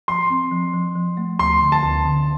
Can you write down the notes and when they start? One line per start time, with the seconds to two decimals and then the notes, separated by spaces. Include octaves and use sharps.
0.08 F3 C6
0.30 C4
0.52 F3
0.74 F3
0.95 F3
1.17 A3
1.39 D2 C6
1.61 D3
1.72 A5
1.83 D2
2.05 D3